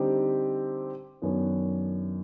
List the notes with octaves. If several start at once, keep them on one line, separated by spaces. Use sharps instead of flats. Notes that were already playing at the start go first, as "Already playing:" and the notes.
Already playing: D3 G3 C4 D#4 G4
F#2 D#3 F#3 B3 D4